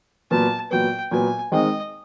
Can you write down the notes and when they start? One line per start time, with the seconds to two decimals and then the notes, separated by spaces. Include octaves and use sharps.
0.31 A#2 F#3 B3 A5
0.71 A#2 F#3 B3 G5
1.11 A#2 F#3 B3 G#5
1.52 D#3 G#3 C4 D#5